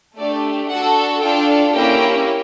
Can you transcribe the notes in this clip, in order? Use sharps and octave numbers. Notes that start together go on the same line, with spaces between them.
A3 D4 G4 D5
D4 F#4 A4 F#5
D4 F4 A4 G5
A#3 C#4 E4 G4 G5